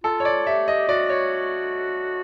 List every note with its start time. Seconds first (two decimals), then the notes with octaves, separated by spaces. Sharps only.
0.04 F4 A4
0.20 C#5
0.25 D5
0.46 G4 E5
0.68 D#5
0.88 F#4 D5
1.10 C#5